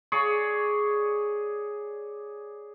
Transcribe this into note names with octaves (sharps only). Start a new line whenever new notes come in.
G#4 C#5 D5